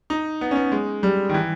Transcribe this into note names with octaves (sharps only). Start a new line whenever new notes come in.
D#4
B3
C#4
B3
G#3
G3
D#3
E3